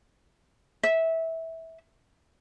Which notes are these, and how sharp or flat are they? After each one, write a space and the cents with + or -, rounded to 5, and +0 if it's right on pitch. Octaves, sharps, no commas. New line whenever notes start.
E5 -15